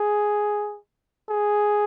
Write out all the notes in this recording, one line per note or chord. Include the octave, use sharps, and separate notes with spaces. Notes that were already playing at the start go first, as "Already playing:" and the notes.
Already playing: G#4
G#4